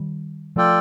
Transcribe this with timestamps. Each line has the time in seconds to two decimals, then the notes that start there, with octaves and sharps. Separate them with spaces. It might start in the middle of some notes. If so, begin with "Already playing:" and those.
Already playing: D#3 G3
0.56 F3 A3 F4 A4 D5 G5